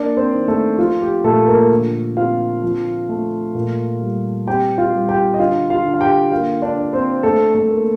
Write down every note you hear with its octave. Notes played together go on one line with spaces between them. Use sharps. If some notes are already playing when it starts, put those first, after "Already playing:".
Already playing: A#3 D4 D5
C4 C5
D#3
A3 A4
F3 F4
G4
A#2 A3 A4
A#3 A#4
D3
C4 F4 F5
F3
A3
A#2
G3
C4 G4 G5
F4 F5
G3
G4 G5
D#5
D3 F4 F5
F4 F5
D3
F5
G4 G5
A#3 F4 F5
D4 D5
D4
C4 C5
A3 D4 A4
A3 A4
A#3